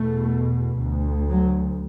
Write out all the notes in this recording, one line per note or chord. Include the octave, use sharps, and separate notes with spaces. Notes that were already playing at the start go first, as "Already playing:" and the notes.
Already playing: E2 B2 A3
D2
F#3